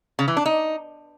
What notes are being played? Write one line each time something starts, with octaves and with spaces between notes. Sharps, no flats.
C#3
E3
D4
D#4